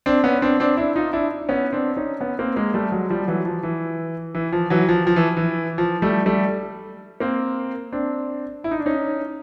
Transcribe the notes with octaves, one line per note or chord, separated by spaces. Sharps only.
C4 D4
B3 C#4
C4 D4
C4 D4
D4 E4
D#4 F4
D4 E4
B3 C#4
C4 D4
C#4 D#4
B3 C#4
A#3 C4
G#3 A#3
G3 A3
F#3 G#3
F3 G3
E3 F#3
F3
E3
E3
F3
E3 F#3
F3
F3
E3
E3
F3
G3 A3
G3 A3
A#3 C4
C4 D4
E4
D#4
D4
C#4 D#4